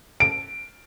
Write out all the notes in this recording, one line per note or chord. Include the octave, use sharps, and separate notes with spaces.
D7